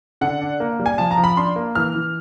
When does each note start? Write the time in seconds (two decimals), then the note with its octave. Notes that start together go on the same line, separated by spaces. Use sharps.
0.21 D3 F#5
0.41 D4
0.60 A#3
0.79 G3
0.86 G#5
0.98 F3 A5
1.11 A#5
1.18 F3
1.24 B5
1.37 D4 C6
1.56 A#3
1.75 E3 F6
1.95 E3